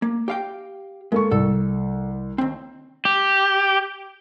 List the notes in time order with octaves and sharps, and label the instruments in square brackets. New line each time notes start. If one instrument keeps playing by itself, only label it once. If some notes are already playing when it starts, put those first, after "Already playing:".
[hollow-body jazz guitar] A#3
G4 F5 G5
[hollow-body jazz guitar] G#3 [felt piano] A#3 A4 C#6
[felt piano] C2 [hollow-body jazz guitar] A4
[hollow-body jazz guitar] D#2 C4
[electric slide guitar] G4